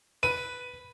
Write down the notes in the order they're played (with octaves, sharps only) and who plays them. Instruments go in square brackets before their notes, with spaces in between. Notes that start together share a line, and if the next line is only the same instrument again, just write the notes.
[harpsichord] B4 [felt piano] D#7